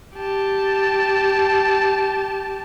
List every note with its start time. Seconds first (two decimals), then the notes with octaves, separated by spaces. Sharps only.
0.17 G4 A5